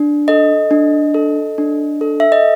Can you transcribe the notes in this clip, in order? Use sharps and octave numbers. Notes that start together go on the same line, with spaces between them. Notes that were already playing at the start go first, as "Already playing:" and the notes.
Already playing: D4
A4 D#5
D4
A4
D4
A4
E5
D#5